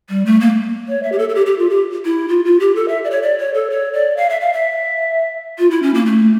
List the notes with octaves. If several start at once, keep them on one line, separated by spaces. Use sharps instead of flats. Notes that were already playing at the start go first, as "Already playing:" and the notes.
G3
A3
A#3
C#5
E5
G4
A4
A4
G4
G4
F4
G4
E4
F4
F4
G4
A4
E5
D5
C#5
D5
C#5
A4
C#5
D5
F5
E5
F5
E5
F4
E4
C#4
A#3
A3